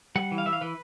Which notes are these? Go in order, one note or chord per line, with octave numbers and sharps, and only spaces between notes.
G3 F#5
E3
F5
E3 E5
F5
E3 B4